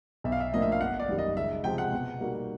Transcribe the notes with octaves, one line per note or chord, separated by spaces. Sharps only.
B1 E5
F5
E5
A2 F3 A#3 D4 D#5
E5
F5
G1 F#5
D5
F#2 D#3 G3
D#5
C#2 E5
C3 F3 G#3 G5
F#5
B2
G3 A#3 D#4 F#4